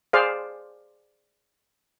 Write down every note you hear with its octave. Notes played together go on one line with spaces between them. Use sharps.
G#4 C5 D5 F5